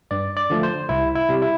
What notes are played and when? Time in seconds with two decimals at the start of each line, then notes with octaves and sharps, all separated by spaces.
0.11 G2 D5
0.37 D5
0.50 D3 F3 A3
0.63 C5
0.89 C2 E4
1.15 E4
1.29 C3 G3
1.42 E4